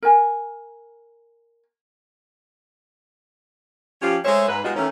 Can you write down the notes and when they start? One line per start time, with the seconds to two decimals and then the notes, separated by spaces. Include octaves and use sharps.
0.03 A#4 G#5
4.01 F3 C#4 F4 G4
4.24 G#3 A3 C5 C#5 E5
4.47 G#2 B4
4.64 G3 G#3 B3 D#4 F4 F#4
4.76 D#3 E3 A3 C#4